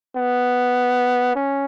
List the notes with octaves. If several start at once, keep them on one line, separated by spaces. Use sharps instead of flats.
B3
C#4